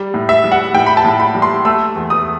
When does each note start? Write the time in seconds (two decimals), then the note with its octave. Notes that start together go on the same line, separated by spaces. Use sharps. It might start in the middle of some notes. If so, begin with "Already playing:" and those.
Already playing: G3
0.14 A2
0.29 E5
0.44 G3
0.52 F#5
0.74 A2 G5
0.86 B5
0.97 A5
1.04 A2
1.20 B5
1.35 G3
1.42 C6
1.65 A3 E6
1.95 E2
2.10 D#6